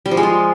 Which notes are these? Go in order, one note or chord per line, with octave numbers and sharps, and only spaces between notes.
G3
F3
G#3
F4